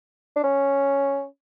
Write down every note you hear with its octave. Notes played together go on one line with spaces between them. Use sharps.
D4
C#4